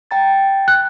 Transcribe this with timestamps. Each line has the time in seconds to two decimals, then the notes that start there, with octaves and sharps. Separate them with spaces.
0.11 G5 A#5 A6
0.68 F#6